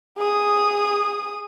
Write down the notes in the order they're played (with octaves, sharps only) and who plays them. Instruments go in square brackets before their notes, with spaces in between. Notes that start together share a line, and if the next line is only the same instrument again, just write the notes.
[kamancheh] G#4 D#6